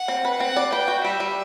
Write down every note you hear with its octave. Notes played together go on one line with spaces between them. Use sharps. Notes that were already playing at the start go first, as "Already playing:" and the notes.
Already playing: F#5
C4
B4
C4 F#5
D5
B4 G5
F#4
G3 E5
G3